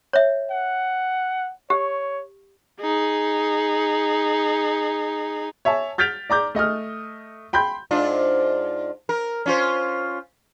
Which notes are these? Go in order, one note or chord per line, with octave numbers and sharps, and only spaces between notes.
C#5 E5
F#5
G4 C#5
D#4 G#4
C#5 E5 G#5 A5
F6 G6 A6 B6 D7 F7
D5 A#5 D6 G6
A3 D#5 D#6 F6
G5 B5 C6 G6
G#2 D4 F4
A#4
C#4 F4 C5